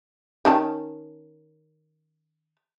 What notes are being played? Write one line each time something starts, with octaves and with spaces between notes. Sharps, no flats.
D#3 C#4 A5